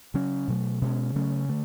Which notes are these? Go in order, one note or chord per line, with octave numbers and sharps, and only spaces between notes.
C#3 F#3 C#4
B2 F#3 A3
B2 G#3 C#4
C#3 F#3 A3 C#4
D3 A3